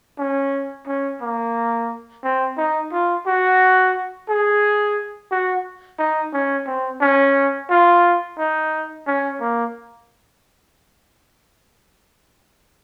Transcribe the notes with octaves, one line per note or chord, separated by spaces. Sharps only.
C#4
C#4
A#3
C4
D#4
F4
F#4
G#4
F#4
D#4
C#4
C4
C#4
F4
D#4
C#4
A#3